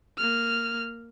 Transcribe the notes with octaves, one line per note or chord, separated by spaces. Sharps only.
A#3 F6